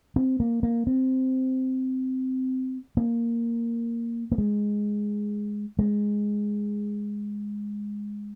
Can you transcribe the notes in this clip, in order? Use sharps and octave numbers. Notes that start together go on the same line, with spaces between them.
C4
A#3
A#3
C4
A#3
A#3
G#3
G#3